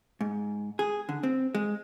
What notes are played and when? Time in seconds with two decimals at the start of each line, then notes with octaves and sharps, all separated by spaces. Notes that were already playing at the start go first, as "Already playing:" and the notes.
0.21 G#2
0.79 G#4
1.09 D3
1.23 C4
1.55 G#3